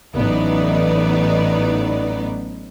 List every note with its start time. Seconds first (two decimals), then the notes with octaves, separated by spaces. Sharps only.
0.15 A1 F#3 B3 D#4 D5